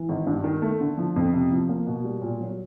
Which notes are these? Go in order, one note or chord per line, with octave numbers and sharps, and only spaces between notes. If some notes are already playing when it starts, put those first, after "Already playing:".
Already playing: E3
G#1
G2
D#3
A3
D3
F3
F2
C3
F3
A#3
B2
G3
A#2
F#3